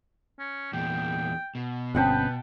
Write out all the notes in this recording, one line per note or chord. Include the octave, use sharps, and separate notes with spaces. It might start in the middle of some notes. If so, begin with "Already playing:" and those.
C#4
E2 A#2 G5
B2
G1 C4 C#4 B4 F#5 G5 A5